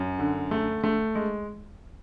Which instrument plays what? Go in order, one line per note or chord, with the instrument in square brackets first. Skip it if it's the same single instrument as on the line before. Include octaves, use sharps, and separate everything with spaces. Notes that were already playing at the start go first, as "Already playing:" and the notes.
Already playing: [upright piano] F#2
D3
A3
A3
G#3